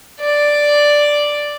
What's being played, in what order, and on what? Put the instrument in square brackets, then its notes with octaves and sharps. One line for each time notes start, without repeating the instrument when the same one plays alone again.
[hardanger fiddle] D5